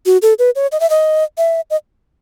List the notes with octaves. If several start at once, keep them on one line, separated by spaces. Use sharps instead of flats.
F#4
A4
B4
C#5
D#5
E5
D#5
E5
D#5